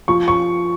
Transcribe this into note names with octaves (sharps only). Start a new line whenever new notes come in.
F3 C#6
C#6